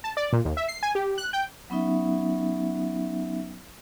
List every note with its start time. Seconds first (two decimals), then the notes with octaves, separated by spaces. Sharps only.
0.04 A5
0.17 D5
0.33 A#2
0.45 D#2
0.57 E5
0.68 C7
0.83 G#5
0.95 G4
1.18 F#6
1.33 G5
1.70 F#3 B3 C#4 D#4 E5